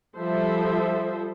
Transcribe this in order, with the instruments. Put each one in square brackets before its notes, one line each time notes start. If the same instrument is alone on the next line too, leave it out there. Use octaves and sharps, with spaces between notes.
[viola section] F3 G3 A4 C5 E5